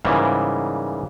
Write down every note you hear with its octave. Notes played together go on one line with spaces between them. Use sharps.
G#2 C#3 E3 G3 A#3